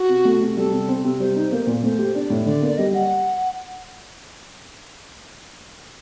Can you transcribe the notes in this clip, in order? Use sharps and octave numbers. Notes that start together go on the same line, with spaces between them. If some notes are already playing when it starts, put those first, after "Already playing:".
Already playing: F#4
C3
A3
C3
G3 A4
C3
C4
C3
G3 C5
D#4
A#3
A#2
A3 C5
G4
D4 D5
A2
D3 D5
A#3
D5
G3 D#5
F#5